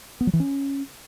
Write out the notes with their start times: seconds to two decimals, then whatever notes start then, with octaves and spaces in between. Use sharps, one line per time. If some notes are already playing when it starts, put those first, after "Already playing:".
0.21 B3
0.27 F#3
0.33 E3
0.40 C#4